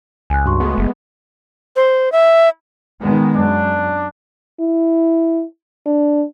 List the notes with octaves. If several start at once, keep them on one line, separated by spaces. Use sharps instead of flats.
C#2 G#5 F#6
G2 F#4 C6 C#6
G#3 A3 B3
F#1
C5
E5
D#3 G#3 B3
F#2 D4
E4
D4